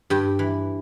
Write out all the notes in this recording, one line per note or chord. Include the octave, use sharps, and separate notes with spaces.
G2 G4
E3